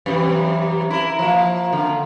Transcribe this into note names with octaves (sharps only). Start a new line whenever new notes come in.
F#2 C3 E3
E4 A#4
F3 A#3
D3